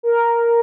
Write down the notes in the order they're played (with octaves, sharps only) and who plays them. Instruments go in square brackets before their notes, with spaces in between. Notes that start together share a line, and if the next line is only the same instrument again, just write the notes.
[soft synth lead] A#4